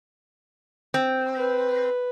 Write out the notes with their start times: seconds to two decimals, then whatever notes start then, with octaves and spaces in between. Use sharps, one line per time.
0.94 C4
1.37 B4